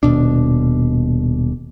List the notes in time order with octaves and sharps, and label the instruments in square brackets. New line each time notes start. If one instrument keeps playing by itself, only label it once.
[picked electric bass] D#1 B2 D4